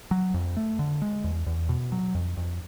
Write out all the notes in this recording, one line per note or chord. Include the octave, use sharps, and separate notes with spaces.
F#3
F2
A3
D3
G#3
E2
E2
B2
F#3
F2
F2